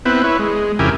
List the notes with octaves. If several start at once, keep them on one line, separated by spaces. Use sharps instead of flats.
B3 C4 E4 B4
E4 B4 C#5
G#3
F2 C#3 E4 G4 A#4 G#5